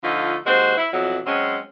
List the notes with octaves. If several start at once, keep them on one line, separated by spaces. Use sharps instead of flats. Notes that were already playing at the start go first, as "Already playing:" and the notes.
D3 F3 A3 D#4 F4
D#2 G#3 F#4 C5
E4
F2 B2 E3 F#3
F#3 G#3 C4 C#4